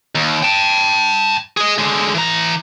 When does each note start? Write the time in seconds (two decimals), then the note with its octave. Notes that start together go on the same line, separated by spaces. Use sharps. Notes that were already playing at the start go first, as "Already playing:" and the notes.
0.15 D#2
0.43 G5 A5
1.57 G#4 D#5
1.78 D3 G#3
2.15 E3 A#5